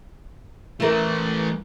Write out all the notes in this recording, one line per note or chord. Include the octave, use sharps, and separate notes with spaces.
E3 A3 E4 A#4